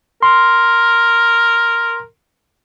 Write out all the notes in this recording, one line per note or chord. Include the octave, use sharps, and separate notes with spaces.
A#4 C6